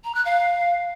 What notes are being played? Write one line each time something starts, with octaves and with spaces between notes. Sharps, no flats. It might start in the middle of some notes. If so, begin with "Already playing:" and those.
A#5
F#6
F5